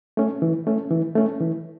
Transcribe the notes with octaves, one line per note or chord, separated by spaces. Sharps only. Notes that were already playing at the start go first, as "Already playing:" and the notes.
A3 C#4
E3
A3 C#4
E3
A3 C#4
E3